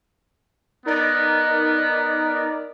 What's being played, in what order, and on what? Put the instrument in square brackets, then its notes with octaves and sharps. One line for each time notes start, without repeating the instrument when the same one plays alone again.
[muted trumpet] B3 [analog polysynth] D#4 A#4 D5